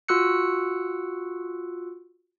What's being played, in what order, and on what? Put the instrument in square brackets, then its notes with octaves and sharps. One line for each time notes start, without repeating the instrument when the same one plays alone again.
[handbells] F4 F#4 E6 F#6 C#7